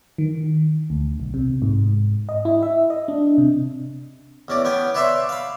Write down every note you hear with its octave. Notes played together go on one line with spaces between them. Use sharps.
D#3
D2
B1
C3
G#2
D#5
E4
E5
D#5
D4
C3
E2 C#4 D5
B3 C#4 G5 G#5
B4 C#5 D5 E5 B5 C6
F5 B5